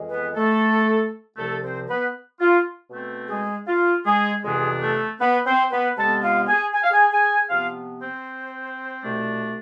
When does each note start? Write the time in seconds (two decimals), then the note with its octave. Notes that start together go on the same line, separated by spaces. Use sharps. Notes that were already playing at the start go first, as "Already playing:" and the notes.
Already playing: F2 E3 G#3
0.10 B3 B4
0.35 A3 A4
1.37 C2 C3 F3 A3 A4
1.63 C4 C5
1.88 B3 B4
2.40 F4
2.90 B2 A3 C4
3.28 G#3 G#4
3.67 F4
4.05 G#3 G#4
4.43 F2 C3 E3 G#3 B3 D4 G#4
4.81 A3 A4
5.20 B3 B4
5.46 C4 C5
5.71 B3 B4
5.97 C3 G#3 B3 A4 A5
6.23 F4 F5
6.47 G#4 G#5
6.73 G#5
6.83 F5
6.91 G#4 G#5
7.11 G#4 G#5
7.50 C3 F3 B3 F4 F5
8.01 C4 C5
9.03 C2 B2 A3 D4